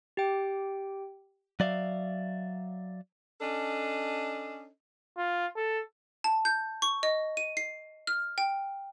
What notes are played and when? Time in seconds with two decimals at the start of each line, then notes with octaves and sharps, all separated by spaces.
0.17 G4 G5
1.60 F#3 D5 E5 F5
3.41 C#4 D4 A4 D#5
5.17 F4
5.56 A4
6.24 A5
6.45 G6
6.82 C#6
7.03 D#5
7.37 D#7
7.57 C7
8.07 F6
8.38 G5